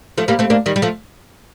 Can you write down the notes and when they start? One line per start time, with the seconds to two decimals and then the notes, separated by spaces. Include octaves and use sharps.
0.18 F3 A3
0.28 G3 A#3
0.39 A3 C4
0.50 A#3 D4
0.66 D#3 G3
0.76 G3
0.82 F3 A3